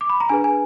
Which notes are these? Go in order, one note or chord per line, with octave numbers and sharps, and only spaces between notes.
D6
B5
A#5
D4 G#4 B4 G#5
G#5